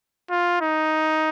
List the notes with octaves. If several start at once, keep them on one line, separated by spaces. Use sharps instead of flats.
F4
D#4